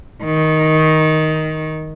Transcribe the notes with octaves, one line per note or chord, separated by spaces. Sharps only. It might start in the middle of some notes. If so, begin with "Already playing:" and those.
D#3